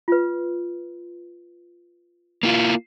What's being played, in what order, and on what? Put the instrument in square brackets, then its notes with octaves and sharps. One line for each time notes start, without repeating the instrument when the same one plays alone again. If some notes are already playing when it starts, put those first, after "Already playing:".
[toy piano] F4 B4
[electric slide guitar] A#3 E4 F4